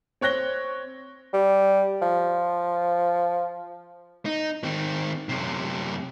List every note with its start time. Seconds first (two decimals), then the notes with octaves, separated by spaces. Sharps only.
0.21 C4 C#5 F#6 A#6 G7
1.33 G3
2.02 F3
4.26 D#4
4.64 D#3 C4
5.29 F#2 C3